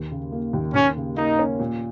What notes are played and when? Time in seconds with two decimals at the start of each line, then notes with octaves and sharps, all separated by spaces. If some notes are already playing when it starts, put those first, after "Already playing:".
Already playing: D#2
0.11 C#3
0.32 A#3
0.53 D#2
0.74 D#2 C#4
0.97 C#3
1.17 A#3 D#4
1.39 C#4
1.60 A#2